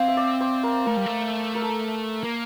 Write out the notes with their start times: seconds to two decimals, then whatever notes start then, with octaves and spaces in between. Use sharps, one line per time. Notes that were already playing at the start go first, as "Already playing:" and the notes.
Already playing: C4 F5 G5
0.08 E5
0.17 D5
0.40 C5
0.63 A#4
0.86 A3 A#4
0.97 G3
1.06 A3
1.55 A#4
1.62 A4
1.69 A#4
2.24 A#3 A#4